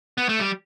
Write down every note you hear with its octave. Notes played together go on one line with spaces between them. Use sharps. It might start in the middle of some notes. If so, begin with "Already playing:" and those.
B3
A3
G3